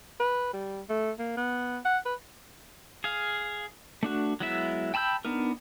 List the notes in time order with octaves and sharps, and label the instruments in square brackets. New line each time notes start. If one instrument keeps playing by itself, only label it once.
[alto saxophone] B4
G3
A3
A#3
B3
F#5
B4
[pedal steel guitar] G#4 F5
A3 D4 F#4
F#3 G#3 B3 E4 E5
G5 A5 B5 E6 G6
B3 D4 D#4 A#4